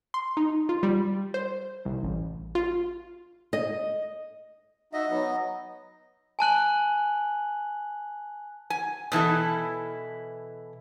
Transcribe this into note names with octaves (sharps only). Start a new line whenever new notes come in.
C6
D#4
F4
G3
C5
C2
A1
F4
D#5
D#4 F#4 D#5 E5
F#3 B3 D#4
G#5 A5 F#6 F#7
G#5
B2 E3 E4 A4